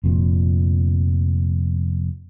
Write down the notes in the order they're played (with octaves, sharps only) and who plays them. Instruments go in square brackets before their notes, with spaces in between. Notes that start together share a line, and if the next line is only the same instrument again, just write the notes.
[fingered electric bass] F1 F2 A#2